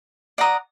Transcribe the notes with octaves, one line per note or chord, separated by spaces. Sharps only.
D5 F#5 A#5 D#6